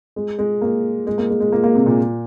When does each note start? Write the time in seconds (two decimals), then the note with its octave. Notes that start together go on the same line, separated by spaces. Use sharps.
0.16 G#3
0.39 G#3
0.62 A#3
1.07 G#3
1.18 A#3
1.30 G#3
1.40 G#3
1.52 A#3
1.64 A#3
1.75 C3
1.86 A#2